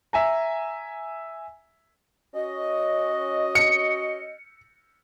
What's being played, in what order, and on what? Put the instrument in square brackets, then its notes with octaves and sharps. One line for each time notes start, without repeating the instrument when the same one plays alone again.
[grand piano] E5 G#5 A#5
[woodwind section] C#4 F#4 D#5
[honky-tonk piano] C#7